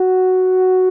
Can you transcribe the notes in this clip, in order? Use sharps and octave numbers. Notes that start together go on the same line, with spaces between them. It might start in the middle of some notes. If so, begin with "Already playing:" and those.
Already playing: F#4